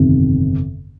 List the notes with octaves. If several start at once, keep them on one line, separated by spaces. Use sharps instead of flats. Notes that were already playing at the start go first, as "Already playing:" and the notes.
Already playing: G1 F2 C3 D#3